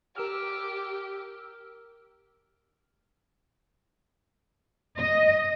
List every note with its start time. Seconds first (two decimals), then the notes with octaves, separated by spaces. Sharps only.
0.16 G4 A#4 E6 F6
4.95 D#5